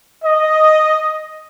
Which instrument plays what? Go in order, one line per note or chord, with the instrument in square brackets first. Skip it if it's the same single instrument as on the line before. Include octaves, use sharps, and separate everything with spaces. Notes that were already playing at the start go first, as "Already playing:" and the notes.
[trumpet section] D#5